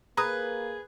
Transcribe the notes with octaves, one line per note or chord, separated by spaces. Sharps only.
A#3 G#4 B4 A#5 D#6